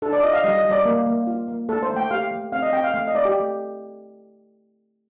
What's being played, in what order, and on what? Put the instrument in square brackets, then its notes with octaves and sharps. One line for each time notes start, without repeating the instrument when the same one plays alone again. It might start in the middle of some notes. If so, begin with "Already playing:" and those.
[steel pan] D4 A4
D5
F4 D#5
F5
G3 D#5
D#5
G3
D5
A#3
A#3
F4
A#3
A3 A4
C5
A3
G5
G4 F5
A3
C4 F5
D#5
C4 G5
F5
A3 F5
D#5
A3 D5
G4
A3